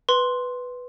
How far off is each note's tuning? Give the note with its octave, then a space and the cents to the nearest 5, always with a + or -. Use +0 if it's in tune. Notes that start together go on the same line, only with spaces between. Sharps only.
B4 +0 C6 +0